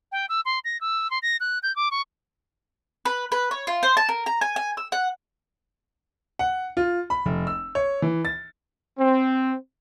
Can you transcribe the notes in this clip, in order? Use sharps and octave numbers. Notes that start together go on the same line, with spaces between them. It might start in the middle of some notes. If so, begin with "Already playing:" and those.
G5
E6
C6
A#6
E6
C6
A#6
F#6
G6
D6
C#6
B4
B4
C#5
F4
C5
A5
A#4
A#5
G#5
G#5
E6
F#5
F#5
F4
B5
F1
E6
C#5
E3
A6
C4